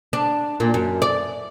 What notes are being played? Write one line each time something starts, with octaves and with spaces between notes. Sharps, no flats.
D4
A#2
F#2
D5